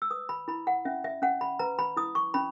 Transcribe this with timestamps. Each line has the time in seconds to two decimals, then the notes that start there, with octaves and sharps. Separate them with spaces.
0.02 E6
0.10 B4 D#6
0.29 B5
0.48 E4 B5
0.67 F#5
0.85 C#4 E5
1.04 E5
1.22 C#4 F#5
1.41 B5
1.59 B4 A#5
1.79 B5
1.97 E4 D#6
2.15 C#6
2.34 C#4 B5